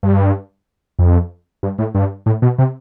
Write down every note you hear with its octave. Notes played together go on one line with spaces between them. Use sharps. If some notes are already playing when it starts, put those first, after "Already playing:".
G2
F2
G2
A2
G2
A2
B2
C3